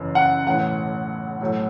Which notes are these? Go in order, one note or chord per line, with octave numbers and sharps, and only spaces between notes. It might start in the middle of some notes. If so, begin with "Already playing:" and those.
Already playing: F#1 F#2 E3
F#5
B1 A2 E3 F#5
B1 A2 F#3